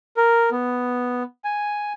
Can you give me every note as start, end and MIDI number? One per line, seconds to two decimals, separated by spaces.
0.17 0.50 70
0.51 1.23 59
1.45 1.93 80